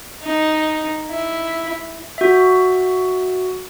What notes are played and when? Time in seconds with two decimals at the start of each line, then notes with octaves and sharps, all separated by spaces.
0.22 D#4
1.10 E4
2.18 F#4 E5